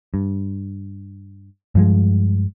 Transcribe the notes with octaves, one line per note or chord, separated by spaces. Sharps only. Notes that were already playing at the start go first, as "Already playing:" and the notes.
G2
G2 F3 G#3